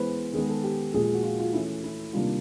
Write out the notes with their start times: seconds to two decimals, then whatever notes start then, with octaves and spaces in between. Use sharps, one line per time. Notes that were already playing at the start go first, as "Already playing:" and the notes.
Already playing: E3 G#3 B3 B4 C5
0.33 D#3 G#3 B3 G#4
0.49 A4
0.64 G4
0.94 A#2 F3 G#3 G#4
1.04 G#4
1.14 F#4
1.23 F4
1.39 F4
1.53 E3 A3 C#4 E4
1.84 E4
2.13 C3 D#3 G3 A#3 D4 F4